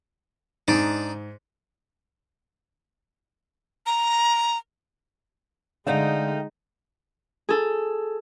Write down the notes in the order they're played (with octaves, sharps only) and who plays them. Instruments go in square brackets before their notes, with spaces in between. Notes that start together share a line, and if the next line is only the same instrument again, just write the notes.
[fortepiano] G#2 [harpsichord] D4 D#4
[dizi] A#5
[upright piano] D3 [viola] G#3 [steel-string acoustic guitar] A3 F5 G5 [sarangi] D#4
[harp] G#4 A4